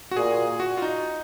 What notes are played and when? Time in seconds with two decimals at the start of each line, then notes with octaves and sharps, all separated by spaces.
0.11 F#4
0.16 A#2 G#4
0.60 F#4
0.77 F4
0.82 D#4